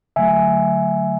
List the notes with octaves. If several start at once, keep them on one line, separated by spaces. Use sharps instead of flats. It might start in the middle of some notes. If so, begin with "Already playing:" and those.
D3 F#3 A3 E5 G#5